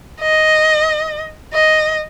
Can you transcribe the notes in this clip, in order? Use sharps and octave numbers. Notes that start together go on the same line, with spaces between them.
D#5
D#5